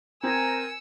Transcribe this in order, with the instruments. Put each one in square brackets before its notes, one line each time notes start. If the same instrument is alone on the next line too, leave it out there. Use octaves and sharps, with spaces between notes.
[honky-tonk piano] C4 [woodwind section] A#4 C5 G#5 [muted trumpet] A#5 [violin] E6 C#7